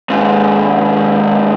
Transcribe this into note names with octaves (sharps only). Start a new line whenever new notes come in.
D#2 G#2